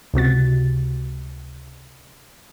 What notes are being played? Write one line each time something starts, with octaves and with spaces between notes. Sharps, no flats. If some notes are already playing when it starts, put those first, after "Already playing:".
C#2 C3 F#4 A6